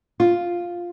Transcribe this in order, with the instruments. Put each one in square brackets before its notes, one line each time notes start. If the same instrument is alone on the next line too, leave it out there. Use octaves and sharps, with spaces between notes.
[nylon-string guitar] F4